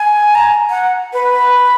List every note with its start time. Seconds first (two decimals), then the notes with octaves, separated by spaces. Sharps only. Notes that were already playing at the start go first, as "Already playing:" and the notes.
Already playing: G#5
0.35 A#5
0.70 F#5
1.13 B4